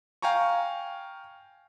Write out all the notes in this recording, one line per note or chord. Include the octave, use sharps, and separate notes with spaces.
F5 G5 G#5 A#5 C#6